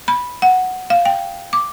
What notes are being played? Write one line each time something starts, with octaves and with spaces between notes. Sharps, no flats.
B5
F#5
F5
G5
D6